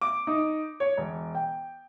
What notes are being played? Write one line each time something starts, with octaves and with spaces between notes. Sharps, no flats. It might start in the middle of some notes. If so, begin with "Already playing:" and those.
D6
D#4
C#5
E1
G5